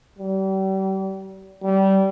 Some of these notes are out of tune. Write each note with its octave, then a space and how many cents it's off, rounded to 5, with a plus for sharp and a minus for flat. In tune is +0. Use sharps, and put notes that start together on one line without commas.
G3 -35
G3 -20